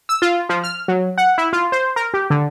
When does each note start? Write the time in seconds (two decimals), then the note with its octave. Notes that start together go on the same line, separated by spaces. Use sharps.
0.09 E6
0.22 F4
0.49 F3
0.64 F6
0.88 F#3
1.18 F#5
1.38 E4
1.53 F4
1.72 C5
1.96 A#4
2.14 G4
2.30 D3